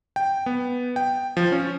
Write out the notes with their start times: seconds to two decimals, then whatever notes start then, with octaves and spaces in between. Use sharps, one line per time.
0.16 G5
0.46 B3
0.96 G5
1.37 F3
1.52 C#4